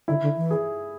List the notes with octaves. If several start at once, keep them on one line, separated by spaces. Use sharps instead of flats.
D3 E4
D3
E3
G#4